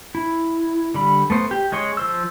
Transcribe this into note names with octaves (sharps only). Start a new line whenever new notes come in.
E4
D3 G3 B5
A3 B3 C5
G4
G#3 G#4 C#5 C6
F3 C5 E6